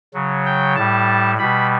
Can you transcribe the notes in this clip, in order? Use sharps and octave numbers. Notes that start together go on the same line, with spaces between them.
C#3 F#3
G5
A2 G3 A5
B2 G3 B5